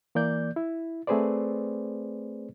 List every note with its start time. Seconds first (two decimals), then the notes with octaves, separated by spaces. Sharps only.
0.15 E3 A#3 D5 G6
0.56 E4
1.07 A3 C4 G#4 B4 C5 D5